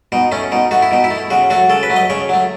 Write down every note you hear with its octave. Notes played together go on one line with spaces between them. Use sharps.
B2 D#4
A3 C#4
B2 D#4
A3 F#4
E4
B2 D#4
E4
A3
C#3 F#4
F#3 A3 F#4
C#3 A4
B4
F#3 A3
D#5
C#3 C#5
F#3 A3